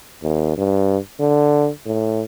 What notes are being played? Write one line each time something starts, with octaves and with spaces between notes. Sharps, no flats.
D#2
G2
D3
A2